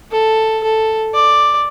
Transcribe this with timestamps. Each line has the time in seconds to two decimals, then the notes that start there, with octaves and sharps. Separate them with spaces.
0.12 A4
0.64 A4
1.14 D5